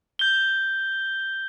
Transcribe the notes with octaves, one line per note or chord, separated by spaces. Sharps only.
G6 G7